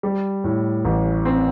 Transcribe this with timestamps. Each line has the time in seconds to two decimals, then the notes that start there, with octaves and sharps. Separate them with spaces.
0.03 G3
0.44 A2
0.85 A1
1.25 C4